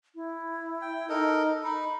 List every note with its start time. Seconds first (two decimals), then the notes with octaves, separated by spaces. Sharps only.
0.15 E4
0.82 G5
1.09 D#4 A4 A#4 D#5
1.64 D#4 B5